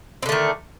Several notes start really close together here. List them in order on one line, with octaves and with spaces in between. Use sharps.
C4 D3 A3 D#3